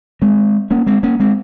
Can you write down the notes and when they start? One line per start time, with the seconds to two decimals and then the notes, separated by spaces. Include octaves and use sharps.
0.22 G#3 C4
0.71 A#3 C#4
0.87 G#3 C4
1.03 A#3 C#4
1.20 G#3 C4